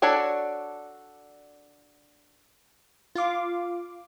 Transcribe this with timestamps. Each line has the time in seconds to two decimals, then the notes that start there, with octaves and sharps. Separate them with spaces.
0.02 D4 F#4 A4 C#5 D5
3.15 F4 F5 D6